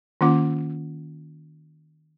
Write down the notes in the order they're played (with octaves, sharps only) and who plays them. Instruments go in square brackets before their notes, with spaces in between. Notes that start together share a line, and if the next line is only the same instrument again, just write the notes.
[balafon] D#3 A#3 C#4 F4 F#5 D6